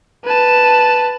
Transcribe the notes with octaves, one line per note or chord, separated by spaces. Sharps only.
B4 A5